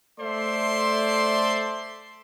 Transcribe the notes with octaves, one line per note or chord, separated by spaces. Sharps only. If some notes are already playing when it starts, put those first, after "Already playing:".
A3 A4 C5 D5 E5 C6